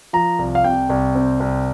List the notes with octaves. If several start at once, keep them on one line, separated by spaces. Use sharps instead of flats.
F3 A#5
C2
F5
C3 G5
C2
C4
C2